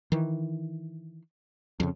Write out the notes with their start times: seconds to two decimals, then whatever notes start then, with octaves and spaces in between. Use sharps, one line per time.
0.12 D#3 E3
1.80 F2 C#3